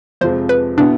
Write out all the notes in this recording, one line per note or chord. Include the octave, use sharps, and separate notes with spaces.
F2 C3 F3 G#3 C5
B4
B2 B3 D4 E4